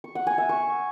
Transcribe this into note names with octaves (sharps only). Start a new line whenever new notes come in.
C#6
F#5
G#5
E5
C#6